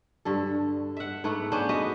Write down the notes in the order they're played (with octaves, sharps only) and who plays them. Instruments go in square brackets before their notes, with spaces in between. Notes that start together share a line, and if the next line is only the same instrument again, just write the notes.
[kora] G2 D3 A4
E5 F#5
G#2 A3 B3 F#5
B3 C#4 D4 C5
F#4 B4 C5 D#5